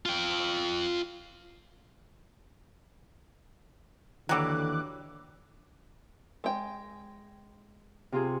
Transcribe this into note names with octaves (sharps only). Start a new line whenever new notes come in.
F4 G5
D#2 D3 E3 F#3 G3 D6 F#6
G#3 G5
C3 F4 G#4